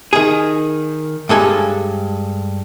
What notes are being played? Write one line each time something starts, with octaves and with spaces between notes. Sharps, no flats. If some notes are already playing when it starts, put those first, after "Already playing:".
D#3 G#4
G2 G#3 A4 G#5